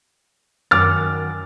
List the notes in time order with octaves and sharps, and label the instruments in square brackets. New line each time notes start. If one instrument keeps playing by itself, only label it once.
[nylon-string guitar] F#2 D#3 F#5 [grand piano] D6 F6 A6